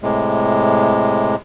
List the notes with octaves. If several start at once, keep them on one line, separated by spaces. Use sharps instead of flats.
A2 C3 G#3